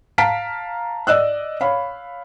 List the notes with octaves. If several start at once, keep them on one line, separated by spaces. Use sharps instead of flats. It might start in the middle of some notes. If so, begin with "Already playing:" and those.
F5 A5 A#5 F6 B6 D7
D5 D#5 E6 F#6
C#5 F5 B5